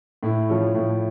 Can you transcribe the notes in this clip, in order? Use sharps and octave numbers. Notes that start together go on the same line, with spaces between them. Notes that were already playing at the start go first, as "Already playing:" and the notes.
A2 E4
F3 A3 C#4
A2